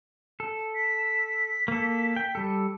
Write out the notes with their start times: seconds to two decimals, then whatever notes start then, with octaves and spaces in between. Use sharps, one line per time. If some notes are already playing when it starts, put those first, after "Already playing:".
0.40 A4
0.75 B6
1.68 A#3 A4
2.16 G5
2.35 G3 A4